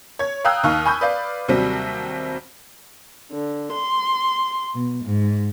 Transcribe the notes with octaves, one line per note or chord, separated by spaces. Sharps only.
C#5 G#6
F5 G5 A#5 D#6 E6 F#6
D#2 D#4 F5 C#6 F6
G#5 B5 C#6 D#6 G6
B4 D5 F5
D#2 C3 F#3 G3 C4
D3
C6
B2
G#2